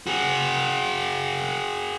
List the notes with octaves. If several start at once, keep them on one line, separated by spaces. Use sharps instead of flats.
F#4 G#4